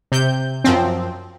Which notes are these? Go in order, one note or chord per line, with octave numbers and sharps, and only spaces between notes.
C3 G6
F#2 F3 C4